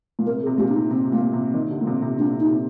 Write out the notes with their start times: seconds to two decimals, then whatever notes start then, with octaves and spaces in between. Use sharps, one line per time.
0.19 A#2
0.26 C3 A#4
0.43 G#4
0.46 C3
0.58 A#2 G4
0.69 D4
0.75 D#4
0.91 C3 C4
1.05 C3
1.12 A#2 A#3
1.33 C3
1.54 D#3
1.70 D3
1.81 A#2
1.87 C3
2.02 C3
2.18 A#2 D4
2.40 D#4
2.51 C3